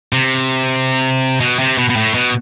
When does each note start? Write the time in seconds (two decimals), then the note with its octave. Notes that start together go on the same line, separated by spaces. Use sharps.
0.13 C3
1.40 B2
1.59 C3
1.78 B2
1.90 B2
1.96 A2
2.14 B2